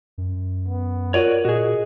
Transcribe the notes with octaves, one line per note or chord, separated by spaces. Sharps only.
F#2
B3
F4 F#4 A#4 C#5 D5 D#7
A#2 F#4 G#4 D#5